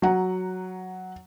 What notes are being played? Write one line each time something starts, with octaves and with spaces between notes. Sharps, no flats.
F#3 F#5 A#5